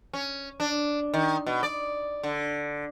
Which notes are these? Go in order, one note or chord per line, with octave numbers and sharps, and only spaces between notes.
C#4
D4
D#3
B2
D5
D3